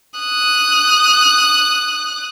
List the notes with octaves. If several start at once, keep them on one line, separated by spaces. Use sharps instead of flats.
D#6 F#6